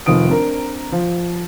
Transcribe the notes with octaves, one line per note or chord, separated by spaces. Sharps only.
F1 D#3 F3 D#6 D7
C4 D4 A#4 A#5
F3